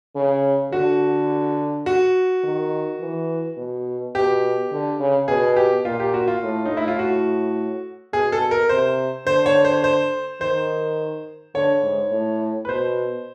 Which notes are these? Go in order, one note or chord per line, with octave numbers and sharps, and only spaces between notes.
C#3
D3 F#4
F#4
D#3
E3
B2
B2 G4
D3
C#3
B2 G#4
G4
A#2 F4
G4
F#4
F4
A2
A2 D#4
E4
F4
F#4
B2 G#4
A4
A#4
C3 C5
D3 C5
C#5
C5
C5
D#3 C5
D3 C#5
G#2
A2
B4
B2 C5